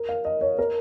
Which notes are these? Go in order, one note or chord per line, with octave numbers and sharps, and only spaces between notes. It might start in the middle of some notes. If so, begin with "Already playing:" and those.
Already playing: A#4
F5
D#5
C#5
A#4